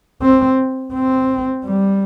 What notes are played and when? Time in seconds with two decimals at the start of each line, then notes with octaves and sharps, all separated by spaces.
0.22 C4
0.93 C4
1.65 G3